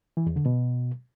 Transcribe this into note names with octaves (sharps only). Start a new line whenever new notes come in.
E3
E2
D3
B2